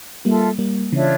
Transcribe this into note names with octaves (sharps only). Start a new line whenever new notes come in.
G3 A#3 F4 A4 E5 A5
G3 A#3
C#3 E3 D4 F4 C#5 E5